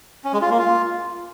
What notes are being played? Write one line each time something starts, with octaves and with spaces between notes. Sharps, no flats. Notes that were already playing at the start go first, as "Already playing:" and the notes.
C#4
G#3
F4
A#3
F4